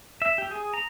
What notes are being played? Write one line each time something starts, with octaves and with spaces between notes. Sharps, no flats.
E5
G4
G#4
A#5